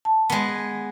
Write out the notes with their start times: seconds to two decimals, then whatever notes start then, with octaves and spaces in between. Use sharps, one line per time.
0.05 A5
0.30 G#3 B3